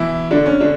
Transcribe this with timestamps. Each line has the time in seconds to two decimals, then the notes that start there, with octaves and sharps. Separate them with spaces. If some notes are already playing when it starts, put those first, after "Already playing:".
Already playing: B2 E3 E4
0.31 D3 D4
0.46 C#4
0.60 D3 D4